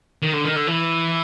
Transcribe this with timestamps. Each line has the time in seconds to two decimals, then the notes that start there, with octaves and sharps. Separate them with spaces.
0.22 D#3
0.33 D3
0.44 D#3
0.56 D3
0.67 E3